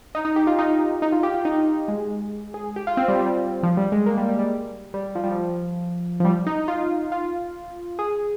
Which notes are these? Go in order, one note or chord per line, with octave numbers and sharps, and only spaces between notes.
D#4
D#4
G4
F4
D#4
D#4
F4
G4
F4
D#4
G#3
G#4
G4
F4
C4
G3
G3
F3
G3
G#3
A#3
G3
G3
G3
G3
F3
G3
F3
F3
G3
D#4
F4
F4
G#4